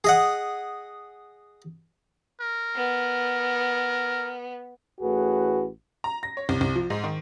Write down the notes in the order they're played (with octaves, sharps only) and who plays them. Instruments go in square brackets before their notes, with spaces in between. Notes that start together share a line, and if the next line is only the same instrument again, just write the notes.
[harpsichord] G#4 D#5 F#5
[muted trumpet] A#4
[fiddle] B3
[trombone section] A1 A2 F#4 G#4 B4
[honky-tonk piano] A#5
A#6
C#5
C2
C2
F3
G#2
D#3